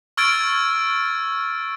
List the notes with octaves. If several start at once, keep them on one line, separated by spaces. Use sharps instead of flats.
C#6 E6 F6 G#6 A6 D7